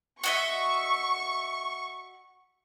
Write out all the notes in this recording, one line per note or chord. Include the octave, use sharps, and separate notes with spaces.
F#4 D#5 E5 C#6